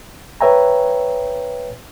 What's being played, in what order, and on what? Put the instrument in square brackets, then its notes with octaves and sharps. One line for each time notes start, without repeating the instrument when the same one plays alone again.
[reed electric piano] B4 C#5 E5 G5 G#5 A#5